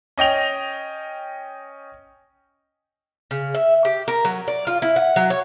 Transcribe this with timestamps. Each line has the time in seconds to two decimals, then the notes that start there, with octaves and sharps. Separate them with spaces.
0.18 C#4 D#5 G5 F7
3.31 C#3
3.55 E5
3.85 G4
4.08 A#4
4.25 F#3
4.48 D5
4.67 F4
4.82 E4
4.96 F#5
5.16 F#3
5.30 C#5